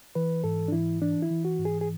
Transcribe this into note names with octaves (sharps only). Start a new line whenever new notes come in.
E3 B4
G#2 A4
D4
E3 E4
E3 D4
E4
E3
F#4
G#2
G#4
G#4